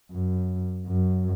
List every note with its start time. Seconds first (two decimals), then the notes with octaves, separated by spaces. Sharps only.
0.12 F#2
0.87 F#2